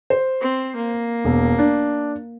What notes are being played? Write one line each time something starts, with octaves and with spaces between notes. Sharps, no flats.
C5
C4
A#3
E1
D4